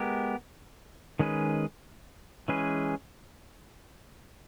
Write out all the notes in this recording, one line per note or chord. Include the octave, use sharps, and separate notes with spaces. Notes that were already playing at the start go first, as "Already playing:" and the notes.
Already playing: G#3 B3 G4 A#4
D#3 G#3 C#4 G#4 B4
E3 G#3 C#4 G#4 B4